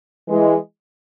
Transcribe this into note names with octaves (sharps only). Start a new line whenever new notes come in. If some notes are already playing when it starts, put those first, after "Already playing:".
E3 G#3